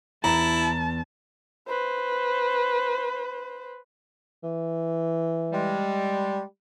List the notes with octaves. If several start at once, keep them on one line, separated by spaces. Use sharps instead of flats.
E2 E4 A5 A#5
B4 C5
E3
G3 G#3